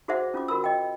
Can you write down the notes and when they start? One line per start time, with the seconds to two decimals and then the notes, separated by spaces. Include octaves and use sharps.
0.08 F#4 G#4 C5 D5 E5 F#5
0.34 C#4 F4 D6
0.48 F#4 A#4 B5 E6
0.64 D#5 G5